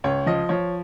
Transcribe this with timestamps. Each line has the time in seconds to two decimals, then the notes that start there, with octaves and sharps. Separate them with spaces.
0.04 C#2 C#5
0.26 F3 D#5
0.49 F3 C#5